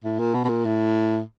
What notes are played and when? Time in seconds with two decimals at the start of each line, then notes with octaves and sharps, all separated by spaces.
0.04 A2
0.19 A#2
0.34 B2
0.44 B2
0.49 A#2
0.65 A2